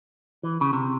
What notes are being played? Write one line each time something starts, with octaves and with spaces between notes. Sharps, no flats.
E3
C#3
C3